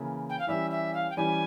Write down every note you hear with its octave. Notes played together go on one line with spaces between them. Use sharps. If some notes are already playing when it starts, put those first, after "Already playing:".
Already playing: C#3 E3 A#3 E4
G5
F5
E3 G3 C#4 G4 E5
E5
F5
G5
E3 G3 C#4 G4 G#5